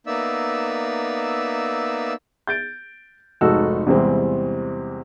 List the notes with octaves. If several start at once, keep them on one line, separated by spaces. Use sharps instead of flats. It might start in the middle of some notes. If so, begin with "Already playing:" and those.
A#3 B3 D#4 D5 E5 E6
G6 A6 D7
F1 G#2 D#4 F#4 A4 E6
E2 G#2 C3 E3 G3 C4